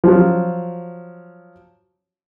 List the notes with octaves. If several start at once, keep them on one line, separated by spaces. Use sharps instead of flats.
F3 F#3